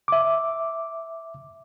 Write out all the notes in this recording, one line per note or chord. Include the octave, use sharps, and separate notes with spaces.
E5 D6